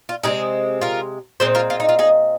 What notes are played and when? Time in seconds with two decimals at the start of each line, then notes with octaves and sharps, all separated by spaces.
0.09 F4
0.23 C3 G#3 C4 D#4 G#4
0.81 F4 A#4
1.40 A#2 G#3 C4 G#4 C5
1.55 F4 A#4
1.70 F4
1.80 D#4
1.89 F4
1.99 D#4 G#4